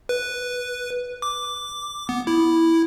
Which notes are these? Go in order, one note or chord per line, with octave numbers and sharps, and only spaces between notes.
B4
D6
B3
E4